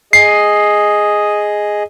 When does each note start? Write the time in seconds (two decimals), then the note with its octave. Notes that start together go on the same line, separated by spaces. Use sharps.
0.13 G#4 D#5 C7